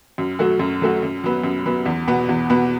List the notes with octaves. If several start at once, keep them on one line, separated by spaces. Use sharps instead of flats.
F#2
F#3 A3 F#4
F#2
F#3 A3 F#4
F#2
F#3 B3
F#2
F#3 B3
E2
B2 B3
E2
B2 B3